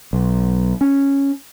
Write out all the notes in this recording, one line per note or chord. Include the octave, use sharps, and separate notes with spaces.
B1
C#4